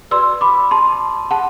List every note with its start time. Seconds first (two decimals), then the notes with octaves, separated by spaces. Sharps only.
0.11 F#4 B4 D5 C6 E6
0.41 B5 D6
0.71 A5 C6
1.31 F#5 A5